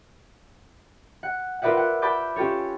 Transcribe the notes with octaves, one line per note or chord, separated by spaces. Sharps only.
F#5
F4 A#4 B4 D5 E5 F#5
F#5
D5 A5 B5 D6 G6
C#4 F4 G4 A4 C#5